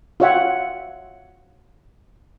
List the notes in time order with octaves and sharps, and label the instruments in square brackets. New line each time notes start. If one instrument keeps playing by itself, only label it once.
[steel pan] F4 F#4 C#5 E5 F#5 G5